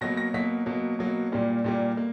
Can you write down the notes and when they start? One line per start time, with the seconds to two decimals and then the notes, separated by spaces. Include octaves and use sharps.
0.01 B2 F#3 A#3 A#6
0.17 A#6
0.34 B2 F#3 A#3 B6
0.66 B2 F#3 A#3
0.99 B2 F#3 A#3
1.32 A#2 G3 A#3
1.64 A#2 G3 A#3
1.97 A#3